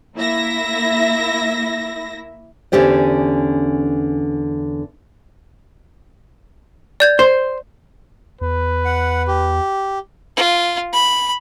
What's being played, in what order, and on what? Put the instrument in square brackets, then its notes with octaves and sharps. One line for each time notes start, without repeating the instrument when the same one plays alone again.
[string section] A#3 E4 E5 A#6
[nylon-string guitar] E2 D3 C#4 G4 C5 D5
[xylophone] D5 G6 G#6
[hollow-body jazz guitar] C5
[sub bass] E2 [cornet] B4
[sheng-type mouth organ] F#5
G4
[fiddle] F4
B5